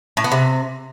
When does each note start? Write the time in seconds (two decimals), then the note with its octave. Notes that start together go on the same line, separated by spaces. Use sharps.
0.17 A2
0.24 B3
0.32 C3